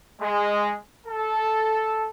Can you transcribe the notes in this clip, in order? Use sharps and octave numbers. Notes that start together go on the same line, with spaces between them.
G#3
A4